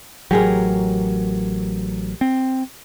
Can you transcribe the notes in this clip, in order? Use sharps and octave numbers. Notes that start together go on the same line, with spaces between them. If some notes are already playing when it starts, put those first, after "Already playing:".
A1 F#3 G4 G#4 A#4
C4